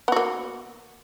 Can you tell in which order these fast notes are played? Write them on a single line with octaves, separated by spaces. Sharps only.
B3 F#4 A#3